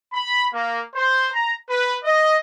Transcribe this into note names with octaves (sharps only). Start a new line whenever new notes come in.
B5
A#3
C5
A#5
B4
D#5